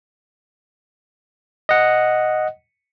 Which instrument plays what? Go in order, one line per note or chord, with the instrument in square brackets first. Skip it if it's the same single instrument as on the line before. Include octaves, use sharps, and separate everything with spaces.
[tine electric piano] D#5 F#5